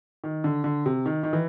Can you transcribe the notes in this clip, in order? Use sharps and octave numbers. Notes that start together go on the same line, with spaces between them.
D#3
D3
D3
C3
D#3
D#3
E3